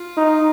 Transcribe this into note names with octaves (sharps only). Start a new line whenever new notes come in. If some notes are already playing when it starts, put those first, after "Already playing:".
Already playing: F4
D#4